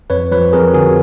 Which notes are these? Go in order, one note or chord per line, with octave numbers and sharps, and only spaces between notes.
F2 B4 C#5
F3 B4 C#5
F2 G#4 A#4
D3 F#4 G#4